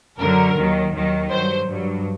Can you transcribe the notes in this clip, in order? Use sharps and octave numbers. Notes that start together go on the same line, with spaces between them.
F#2 D3 F#3 A#4
D#2 D#3 F#3
D#2 D#3 F#3
G2 F#3 C5
G2 F#3